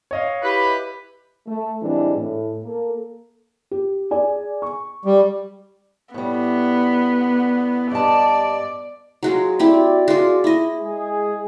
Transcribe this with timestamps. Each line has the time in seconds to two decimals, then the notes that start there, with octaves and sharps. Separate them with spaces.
0.11 C#5 D#5 F5
0.43 E4 G4 B4
1.47 A3
1.83 A2 E3 G3 G#3 C4 D4
2.16 A2
2.64 A#3 A4
3.71 G4
4.11 G#4 D5 G#5
4.62 C#6
5.05 G3
6.14 A2 G3 B3
7.92 G2 D5 D#5 A5
9.23 F#3 G#3 F4
9.59 C4 E4 F#4 G4 D5
10.08 G#3 F4
10.44 E4 D#5
10.81 G#3 G#4